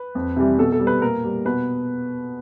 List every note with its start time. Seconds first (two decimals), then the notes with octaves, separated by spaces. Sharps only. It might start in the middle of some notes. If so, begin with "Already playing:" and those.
Already playing: B4
0.15 F2
0.36 C3 E3 G3
0.58 B2 A4
0.72 A4
0.80 G3
0.87 B4
1.02 A#2 A#4
1.24 G3
1.45 B2 B4